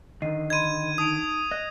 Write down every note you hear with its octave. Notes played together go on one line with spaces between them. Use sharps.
D3 D#3 D#5 C7 D#7
D#5 B5 C6 G#6 D#7
D#4 A5 D#6 D7
D#5 F#6